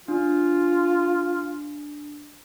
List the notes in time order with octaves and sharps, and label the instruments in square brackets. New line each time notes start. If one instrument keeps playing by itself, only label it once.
[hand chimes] D4 [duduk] F4